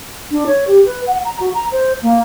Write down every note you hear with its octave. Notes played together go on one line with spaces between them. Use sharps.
D4
C#5
G4
B4
F#5
A#5
F#4
A#5
C5
A#3